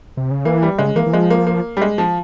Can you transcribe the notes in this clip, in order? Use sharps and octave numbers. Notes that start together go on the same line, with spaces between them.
C3
C#3
E3 A#3
G3
C#3 G#3
E3 A#3
E3
F3 G#3
A#3
A#3
G3
G#3
F3